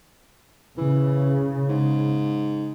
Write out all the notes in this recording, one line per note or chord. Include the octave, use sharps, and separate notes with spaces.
C#3 E3
G#2